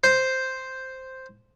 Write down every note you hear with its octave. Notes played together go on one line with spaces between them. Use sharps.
C5